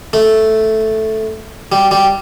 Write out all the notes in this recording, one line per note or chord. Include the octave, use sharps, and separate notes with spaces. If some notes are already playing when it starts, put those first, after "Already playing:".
A3
G3
G3